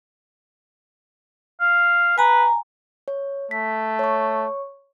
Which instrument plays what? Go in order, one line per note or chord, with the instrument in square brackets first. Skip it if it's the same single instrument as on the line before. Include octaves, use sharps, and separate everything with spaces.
[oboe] F5
[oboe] B4 [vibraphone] G#5 A#5
[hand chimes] C#5
[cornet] A3 [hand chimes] B6
[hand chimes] C#5 C#6